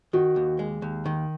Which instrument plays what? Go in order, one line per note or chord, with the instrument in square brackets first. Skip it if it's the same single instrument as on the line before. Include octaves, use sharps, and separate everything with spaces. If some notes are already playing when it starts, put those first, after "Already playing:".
[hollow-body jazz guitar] D#3 [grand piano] F#4
[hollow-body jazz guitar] D#2
G#3
D#2
D#3